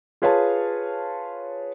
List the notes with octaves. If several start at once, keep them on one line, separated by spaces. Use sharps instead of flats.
F4 G#4 B4 C#5 F5 A5